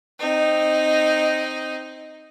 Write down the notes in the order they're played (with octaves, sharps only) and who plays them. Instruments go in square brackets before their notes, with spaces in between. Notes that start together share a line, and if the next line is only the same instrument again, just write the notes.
[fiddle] C4 D#4